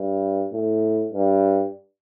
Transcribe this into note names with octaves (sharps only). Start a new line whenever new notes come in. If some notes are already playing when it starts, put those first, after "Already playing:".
Already playing: G2
A2
G2